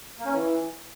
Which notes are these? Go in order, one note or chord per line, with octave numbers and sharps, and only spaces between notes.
A#3
C#4
E3